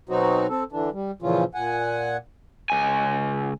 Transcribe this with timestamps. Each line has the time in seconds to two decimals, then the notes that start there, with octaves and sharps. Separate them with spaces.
0.09 B2 F#3 C4 D#4 F#4
0.49 C4 A4
0.72 D3 E3 D4
0.93 G3
1.22 A#2 C#3 E3 F3 C#4 F4
1.54 A#2 F#5 G#5
2.70 C#2 G#5